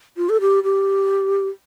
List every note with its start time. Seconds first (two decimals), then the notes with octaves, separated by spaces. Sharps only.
0.17 F4
0.29 A4
0.40 G4
0.63 G4